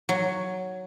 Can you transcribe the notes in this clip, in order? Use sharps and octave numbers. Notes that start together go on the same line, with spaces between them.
F#3